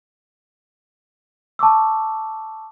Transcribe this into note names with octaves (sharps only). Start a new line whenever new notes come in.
A5 C#6 D6 E6